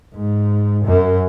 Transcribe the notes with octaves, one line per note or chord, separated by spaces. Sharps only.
G#2
F#2